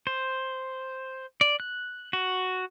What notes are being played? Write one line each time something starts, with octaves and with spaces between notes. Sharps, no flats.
C5
D5
F#6
F#4